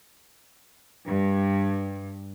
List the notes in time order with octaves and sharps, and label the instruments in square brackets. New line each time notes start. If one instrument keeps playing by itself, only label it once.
[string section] G2